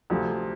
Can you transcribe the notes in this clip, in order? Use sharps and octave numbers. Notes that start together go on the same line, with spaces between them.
D2 C3 F3